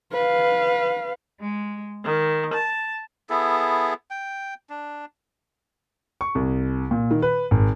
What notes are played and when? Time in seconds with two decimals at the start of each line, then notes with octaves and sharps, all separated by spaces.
0.12 B4 F5
1.40 G#3
2.04 D#3
2.53 A5
3.30 B3 E4 G#4 A4
4.11 G5
4.70 D4
6.21 C#6
6.35 C2
6.91 A#2
7.11 D#3
7.22 B4
7.51 G#1